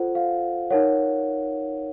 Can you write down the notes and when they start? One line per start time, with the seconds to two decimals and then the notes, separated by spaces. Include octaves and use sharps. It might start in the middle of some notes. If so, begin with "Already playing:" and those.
Already playing: F4 A4 C5 F#5
0.15 F5
0.70 D#4 A#4 C#5 F#5